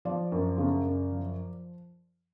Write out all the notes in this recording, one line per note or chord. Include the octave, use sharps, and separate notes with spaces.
F3 D5
F#2
C#3
F#2
F3